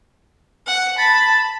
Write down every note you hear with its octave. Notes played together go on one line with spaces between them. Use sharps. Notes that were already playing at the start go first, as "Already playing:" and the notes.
F#5
A5 B5 A6